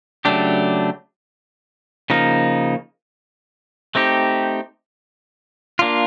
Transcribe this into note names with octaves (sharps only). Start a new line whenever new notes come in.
C#3 F#3 A3 D4 G4
C#3 F3 A#3 D#4
A3 C4 D#4 G4
A#3 D4 F4